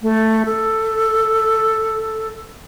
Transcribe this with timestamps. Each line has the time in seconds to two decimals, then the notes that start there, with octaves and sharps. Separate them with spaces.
0.02 A3
0.45 A4